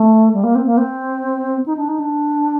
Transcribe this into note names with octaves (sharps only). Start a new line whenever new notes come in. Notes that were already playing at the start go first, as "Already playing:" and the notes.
Already playing: A3
G3
A#3
C4
A#3
C4
D#4
D4
D#4
D4